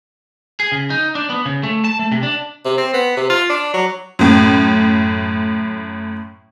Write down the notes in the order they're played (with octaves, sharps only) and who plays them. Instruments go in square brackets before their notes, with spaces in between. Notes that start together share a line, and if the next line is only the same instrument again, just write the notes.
[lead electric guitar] G#4
C#3
D#4
D4
B3
C#3
A3
A5
A3
C3
D4
[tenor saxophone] C3
C4
B3
C3
F4
D4
F#3
[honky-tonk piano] F#2 A2